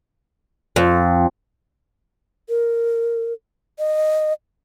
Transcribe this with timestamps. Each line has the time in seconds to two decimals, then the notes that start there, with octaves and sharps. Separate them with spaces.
0.76 F2
2.49 A#4
3.79 D#5